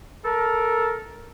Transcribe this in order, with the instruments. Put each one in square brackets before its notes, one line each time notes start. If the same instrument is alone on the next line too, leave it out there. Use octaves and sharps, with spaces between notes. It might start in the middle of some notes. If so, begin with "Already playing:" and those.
[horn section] A4 A#4